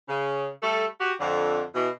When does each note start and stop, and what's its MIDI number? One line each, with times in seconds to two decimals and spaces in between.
0.09 0.47 49
0.62 0.85 55
0.62 0.85 57
0.62 0.85 69
0.99 1.12 66
0.99 1.12 67
1.20 1.62 41
1.20 1.62 50
1.75 1.89 47
1.75 1.89 52